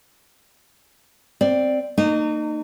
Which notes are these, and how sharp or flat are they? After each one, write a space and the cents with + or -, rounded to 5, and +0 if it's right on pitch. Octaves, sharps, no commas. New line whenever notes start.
C4 +0 D5 +5
A#3 -35 D#4 -25